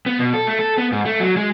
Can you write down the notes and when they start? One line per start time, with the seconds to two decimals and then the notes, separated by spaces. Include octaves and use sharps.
0.06 B3
0.20 B2
0.34 A4
0.47 A3
0.59 A4
0.78 B3
0.92 G#2
1.05 A3
1.20 F#3
1.37 G#3